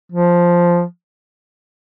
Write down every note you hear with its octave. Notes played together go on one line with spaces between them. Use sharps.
F3